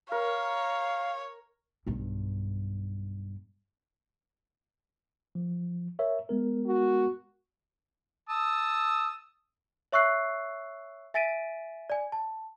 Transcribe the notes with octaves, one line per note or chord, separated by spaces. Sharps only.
A#4 C#5 F5
B1 G2
F3
A#4 C#5 E5
G#3 B3 A#4
F#4
A5 D#6 E6
C#5 E5 C#6 E6 F#6 C7
E5 G#5 A6 B6 D7 D#7
D5 G#5
A5